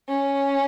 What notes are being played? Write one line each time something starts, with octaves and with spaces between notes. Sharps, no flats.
C#4